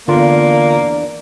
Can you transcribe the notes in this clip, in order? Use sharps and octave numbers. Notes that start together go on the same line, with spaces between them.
E2 D3 A#3 D4 F4